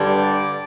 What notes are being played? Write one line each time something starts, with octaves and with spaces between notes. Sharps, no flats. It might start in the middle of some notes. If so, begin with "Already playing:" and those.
Already playing: G2 D3 G3
D5